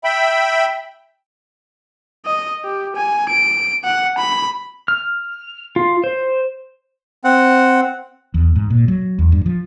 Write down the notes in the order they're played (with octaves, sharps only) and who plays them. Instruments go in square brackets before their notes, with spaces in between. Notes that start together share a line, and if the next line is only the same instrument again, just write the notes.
[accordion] E5 G5 B5
[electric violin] D#5
G4
G#5
D7
F#5
B5
[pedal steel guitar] F6
F4
C5
[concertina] C4 F#5
[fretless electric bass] E2
G#2
A#2
F#3
E2
G2
F3